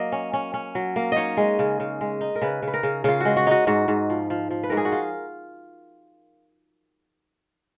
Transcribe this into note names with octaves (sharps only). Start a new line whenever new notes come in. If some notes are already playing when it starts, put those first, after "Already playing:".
Already playing: F#3 A#3 D#5
C#4
C#4
C#4
F#3
A#3
D#4 C#5 D#5
G#3
C#3
C#3
G#3
D#4
A#4
C#3 B4
C#3
B4
A#4
C#3
C#3 F4
G#3 F#4
F#4
D#4 F#4
G#2 F#4
G#2
F3
F3
F3
B4
G#2 A#4
G#4
F#4
F4